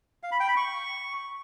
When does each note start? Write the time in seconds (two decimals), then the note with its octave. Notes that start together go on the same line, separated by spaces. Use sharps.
0.23 F5
0.32 B5
0.40 G5
0.48 B5
0.57 C#6